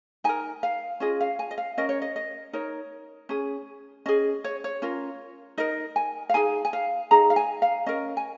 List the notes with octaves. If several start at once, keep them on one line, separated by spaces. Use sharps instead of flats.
D#4 A#4 G#5
F5
C#4 F4 G#4 D#5
F5
G#5
D#5
F5
C#4 A#4 D#5
C#5
D#5
D#5
D#4 A#4 C#5
C#4 G#4
C#4 G#4 D#5
C#5
C#5
C#4 F4 A#4
D#4 A#4 D#5
G#5
F5
D#4 G#4 G#5
G#5
F5
D#4 G#4 A#5
F5
G#5
F5
C#4 A#4 D#5
G#5